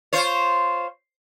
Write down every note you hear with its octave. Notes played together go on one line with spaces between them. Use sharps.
F4 C5 C#5